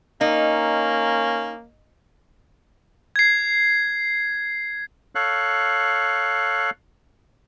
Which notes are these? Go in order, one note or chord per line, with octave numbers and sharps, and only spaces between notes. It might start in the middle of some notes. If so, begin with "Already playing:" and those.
A#3 C#4 D#4
G#6 C7
A4 C#5 F5 F#6